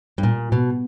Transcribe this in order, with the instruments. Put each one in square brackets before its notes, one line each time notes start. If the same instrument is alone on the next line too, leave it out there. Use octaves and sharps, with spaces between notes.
[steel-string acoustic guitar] G2
A#2
B2